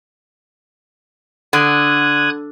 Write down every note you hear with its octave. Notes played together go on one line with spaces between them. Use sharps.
D3 D#6 F#6 G#6